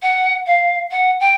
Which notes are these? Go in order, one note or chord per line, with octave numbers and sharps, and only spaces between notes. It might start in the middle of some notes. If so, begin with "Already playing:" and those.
F#5
F5
F#5
G5